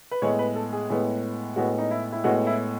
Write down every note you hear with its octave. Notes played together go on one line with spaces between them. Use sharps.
B4
A2 G#3 B3 C#5
B4
A4
G#4
A2 G#3 B3
A2 G#3 B3 F#4
D#4
E4
E4
A2 G#3 B3 F#4
E4